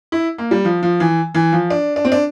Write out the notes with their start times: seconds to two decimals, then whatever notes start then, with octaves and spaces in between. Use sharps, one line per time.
0.12 E4
0.38 A#3
0.51 G3
0.65 F3
0.83 F3
1.00 E3
1.35 E3
1.52 F3
1.70 D4
1.96 D4
2.05 C4
2.12 D4